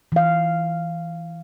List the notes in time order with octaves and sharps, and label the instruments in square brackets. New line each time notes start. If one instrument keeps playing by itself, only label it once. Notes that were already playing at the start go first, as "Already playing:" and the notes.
[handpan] E3 F5